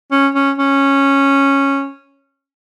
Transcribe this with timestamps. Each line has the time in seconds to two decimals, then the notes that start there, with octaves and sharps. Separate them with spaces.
0.11 C#4
0.35 C#4
0.58 C#4